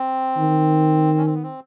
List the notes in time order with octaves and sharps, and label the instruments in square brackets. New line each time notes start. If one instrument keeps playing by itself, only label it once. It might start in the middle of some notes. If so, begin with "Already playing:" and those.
Already playing: [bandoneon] C4
[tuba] D#3
[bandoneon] C#4
C4
B3
C4